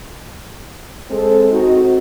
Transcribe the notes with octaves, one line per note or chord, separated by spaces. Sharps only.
G#3 C4 A4
C4 D#4 F#4